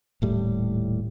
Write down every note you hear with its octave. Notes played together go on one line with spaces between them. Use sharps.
D#1 A2 G3